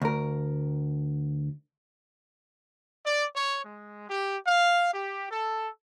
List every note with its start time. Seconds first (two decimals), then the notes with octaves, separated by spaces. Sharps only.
0.02 D2 A#4
3.05 D5
3.36 C#5
3.65 G#3
4.09 G4
4.47 F5
4.94 G4
5.31 A4